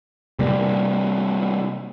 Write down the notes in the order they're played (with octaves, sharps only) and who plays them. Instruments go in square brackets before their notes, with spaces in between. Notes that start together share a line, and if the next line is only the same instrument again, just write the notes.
[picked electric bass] C3 G3 A#3